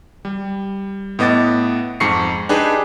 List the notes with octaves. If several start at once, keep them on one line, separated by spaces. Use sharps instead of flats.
G3
A2 B3 D#5 D6 A6
F2 G#2 C#6 C7 C#7
D4 D#4 G4 G#4 B4